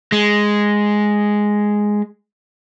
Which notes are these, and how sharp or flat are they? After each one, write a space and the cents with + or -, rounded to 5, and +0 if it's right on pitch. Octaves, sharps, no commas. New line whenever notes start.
G#3 +0